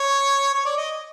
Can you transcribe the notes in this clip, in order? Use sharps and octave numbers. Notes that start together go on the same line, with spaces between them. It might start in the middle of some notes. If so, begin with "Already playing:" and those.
Already playing: C#5
C#5
D5
D#5